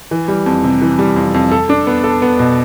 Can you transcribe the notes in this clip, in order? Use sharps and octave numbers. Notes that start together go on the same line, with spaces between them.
E3
G3
F2
C3
E3
G3
F2
F2
A4
D4
B3
A4
B3
B2